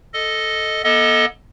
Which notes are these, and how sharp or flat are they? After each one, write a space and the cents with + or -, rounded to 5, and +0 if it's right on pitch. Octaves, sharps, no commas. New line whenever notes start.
A4 +0 D#5 +0
B3 -45 A4 +0 D#5 +20